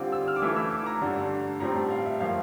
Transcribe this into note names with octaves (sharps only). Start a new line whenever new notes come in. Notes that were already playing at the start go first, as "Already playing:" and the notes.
Already playing: D3 G3 C4 F4 D6
E6
F6
D6
E3 A3 E4 E6
E6
D6
A#5
G2 D3 A3
A2 G3 C4 A#5
A5
F5
E5
A2 F3 A#3 F5